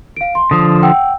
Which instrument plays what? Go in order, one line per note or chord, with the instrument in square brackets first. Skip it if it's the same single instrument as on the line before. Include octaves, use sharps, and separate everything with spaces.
[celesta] F5 D7
C6
[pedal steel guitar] D3 F3 [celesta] D#6
[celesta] F#5 G5 E6